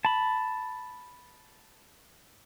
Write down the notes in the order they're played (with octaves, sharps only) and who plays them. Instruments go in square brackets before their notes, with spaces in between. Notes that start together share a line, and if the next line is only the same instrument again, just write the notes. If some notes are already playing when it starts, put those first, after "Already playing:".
[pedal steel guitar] A5 B5